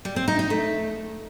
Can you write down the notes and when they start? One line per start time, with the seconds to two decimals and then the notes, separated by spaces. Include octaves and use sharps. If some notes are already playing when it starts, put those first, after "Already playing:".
0.05 G3
0.16 C4
0.28 D#4
0.39 D#4
0.50 A3